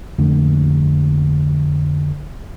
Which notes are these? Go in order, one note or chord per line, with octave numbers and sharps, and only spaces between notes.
A#1 F2 D3 A3